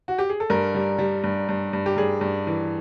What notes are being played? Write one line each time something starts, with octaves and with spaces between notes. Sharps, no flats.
F#4
G4
G#4
A4
G2 A#4
G3
G3
G2
G2
G2
G4
G2 G#4
G2
E3